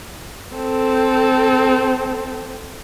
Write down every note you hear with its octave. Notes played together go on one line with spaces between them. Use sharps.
C4 A4